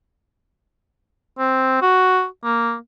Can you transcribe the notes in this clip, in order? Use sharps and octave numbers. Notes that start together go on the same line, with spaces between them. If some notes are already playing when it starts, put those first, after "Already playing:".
C4
F#4
A#3